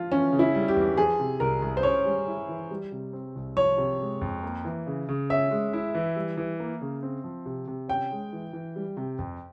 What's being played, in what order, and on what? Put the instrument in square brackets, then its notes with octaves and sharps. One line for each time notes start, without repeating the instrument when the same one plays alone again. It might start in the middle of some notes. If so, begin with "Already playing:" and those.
Already playing: [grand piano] F3 [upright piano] F4
[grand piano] E3 [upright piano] C#4
[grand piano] C#3
[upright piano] E4
[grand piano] G3
[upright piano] G4
[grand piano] E2
[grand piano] F3 [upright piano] G#4
[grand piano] C3
[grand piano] C2 [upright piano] A#4
[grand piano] C2
[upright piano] C5
[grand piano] C#4 [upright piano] C#5
[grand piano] G3
E4
E3
G3
C3
C4
C2
[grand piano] F3 [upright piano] C#5
[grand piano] C3
G#3
F2
A#3
E3
C#3
C#3
[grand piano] C#4 [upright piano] E5
[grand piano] G#3
E4
E3
G3
E3
A#3
C#3
C4
F3
C3
C3
[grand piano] C#4 [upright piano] G5
[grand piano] G#3
E3
E3
G3
C3
F2